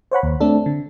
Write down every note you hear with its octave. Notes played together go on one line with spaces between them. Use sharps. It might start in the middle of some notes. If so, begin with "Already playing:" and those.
C5 C#5 F#5 B5
D#2
A3 C4 D4 A4
D3